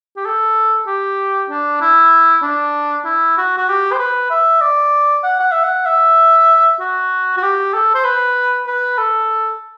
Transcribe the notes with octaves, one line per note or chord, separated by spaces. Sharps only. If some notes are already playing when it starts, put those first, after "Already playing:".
G4
A4
G4
D4
E4
D4
E4
F#4
F#4
G4
C5
B4
E5
D5
F#5
F#5
E5
F#5
E5
F#4
F#4
G4
A4
C5
B4
B4
A4